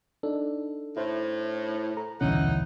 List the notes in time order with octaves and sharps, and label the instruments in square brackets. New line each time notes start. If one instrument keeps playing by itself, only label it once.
[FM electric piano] D4 D#4 [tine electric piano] A4
[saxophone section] A2 [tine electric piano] E4 C5
[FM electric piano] A4 [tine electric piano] A#5
[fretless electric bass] D#1 B1 [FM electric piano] D3 E3 C#4 [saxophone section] D#4 E4 F#5